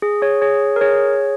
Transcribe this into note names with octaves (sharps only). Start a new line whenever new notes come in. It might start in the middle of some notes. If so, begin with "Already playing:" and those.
G#4
G#4 C#5
G#4 C#5
A#4
G#4 C#5